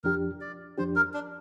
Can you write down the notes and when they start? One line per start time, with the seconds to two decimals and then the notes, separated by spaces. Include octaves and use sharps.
0.04 F2 F3 D4 G4 A#4
0.41 D5
0.78 F2 F3 D4 G4 C5
0.96 A#4
1.14 D4